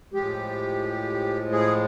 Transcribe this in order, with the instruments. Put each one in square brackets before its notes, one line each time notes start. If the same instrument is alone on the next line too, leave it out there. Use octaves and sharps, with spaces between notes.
[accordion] A2 F3 G#3 G4
G#4